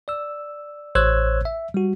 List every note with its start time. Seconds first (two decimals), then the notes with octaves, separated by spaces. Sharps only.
0.08 D5 E6
0.95 A1 C5 C#5 E6 F#6 G#6
1.45 E5
1.74 G3 F#4